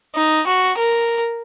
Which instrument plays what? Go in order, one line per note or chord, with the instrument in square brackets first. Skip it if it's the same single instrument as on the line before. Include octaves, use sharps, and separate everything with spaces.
[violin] D#4
F#4
A#4